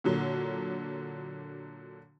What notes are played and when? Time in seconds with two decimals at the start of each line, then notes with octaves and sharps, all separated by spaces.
0.04 A#2 D3 F#3